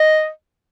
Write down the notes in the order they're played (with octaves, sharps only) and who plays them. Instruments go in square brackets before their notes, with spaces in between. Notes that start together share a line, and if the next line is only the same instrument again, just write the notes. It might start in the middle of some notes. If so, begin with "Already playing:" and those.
Already playing: [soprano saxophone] D#5